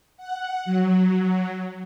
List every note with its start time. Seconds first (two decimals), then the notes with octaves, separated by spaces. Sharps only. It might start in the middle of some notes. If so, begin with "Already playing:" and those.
0.17 F#5
0.65 F#3